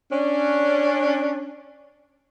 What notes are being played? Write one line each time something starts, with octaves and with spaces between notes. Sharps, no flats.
C#4 D4